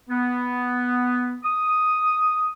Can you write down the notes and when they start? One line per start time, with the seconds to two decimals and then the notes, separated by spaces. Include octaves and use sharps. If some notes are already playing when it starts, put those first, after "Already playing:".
0.10 B3
1.44 D#6